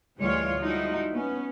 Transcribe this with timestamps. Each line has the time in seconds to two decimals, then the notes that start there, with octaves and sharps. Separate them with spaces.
0.17 D2 E3 G3 G#3 F4 C#5
0.59 F3 G3 G#3 D#4 E4 F#4
1.13 B3 C#4